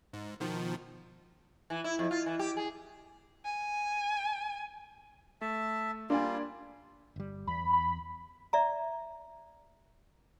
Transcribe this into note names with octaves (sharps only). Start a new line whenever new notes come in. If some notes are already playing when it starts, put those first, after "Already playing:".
G#2
B2 D#3 F3
E3
E4
F2
F4
E3
G4
G#4
G#5
A3 E5 A5
G3 A#3 D4 F4 D5 G#5
G1 G3
E2 B5
B5
D5 E5 A#5